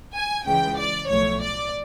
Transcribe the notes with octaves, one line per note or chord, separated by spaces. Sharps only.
G#5
C#2 C#3 E3 G#3 G5
D5
B1 A2 F3 A3 C#5
D5